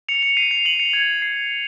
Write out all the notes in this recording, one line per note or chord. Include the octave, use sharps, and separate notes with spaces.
C#7 F7
C#7 F7
C7 D#7
C#7 F7
D#7 F#7
C#7 F7
G#6
C7